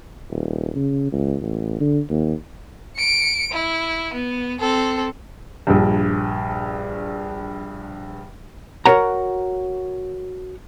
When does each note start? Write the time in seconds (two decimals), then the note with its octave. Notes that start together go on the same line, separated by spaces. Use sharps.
0.30 D#1
0.75 C#3
1.12 C#2
1.42 A1
1.80 D3
2.10 D#2
2.97 C#7 D7
3.52 E4
4.13 B3
4.60 C4 A4
5.67 A#1 G2
8.86 F#4 A#4 C#5 F#5 A#5